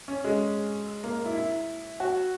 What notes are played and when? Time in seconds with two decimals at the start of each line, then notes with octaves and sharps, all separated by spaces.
0.08 C#4
0.25 G#3
1.04 A#3
1.25 E4
1.36 E4
2.00 F#4